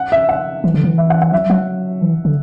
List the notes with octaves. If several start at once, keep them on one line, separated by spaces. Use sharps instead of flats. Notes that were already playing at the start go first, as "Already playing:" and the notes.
Already playing: F#5
E5
F#5
E3
D3
E3
E5
F#5
F#5
F#3 E5
F#3 F#5
E3
D3